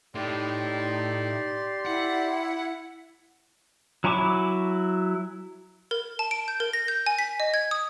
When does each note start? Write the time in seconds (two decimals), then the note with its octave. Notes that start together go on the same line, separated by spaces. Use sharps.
0.15 A2 D#4 G4 D5 C6
1.86 E4 F#5
4.04 F#3 E4 G#5 C#6 D6
5.91 A#4
6.19 A5
6.31 D7
6.48 G6
6.60 A#4
6.73 A#6
6.88 G6
7.06 G#5
7.19 B6
7.40 D#5
7.54 G#6
7.71 D#6